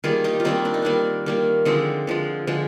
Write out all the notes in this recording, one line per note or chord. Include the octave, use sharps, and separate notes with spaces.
D#3 G3 A#3 F4 G#4
D#4 G4
F4
D#3 G3 A#3 C4 D#4
D4
D#4
D#3 G3 A#3 D4
D#3 G3 A#3
D3 F3 G#3 C4 D#4
D3 F3 G#3
D3 F3 G#3